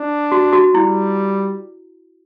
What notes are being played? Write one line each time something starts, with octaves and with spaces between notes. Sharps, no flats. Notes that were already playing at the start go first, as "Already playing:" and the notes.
Already playing: D4
F#4
F#4
G3 E4